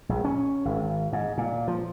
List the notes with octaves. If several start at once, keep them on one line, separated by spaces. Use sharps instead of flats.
A#1
C#4
G#1
G#2
A#2
F3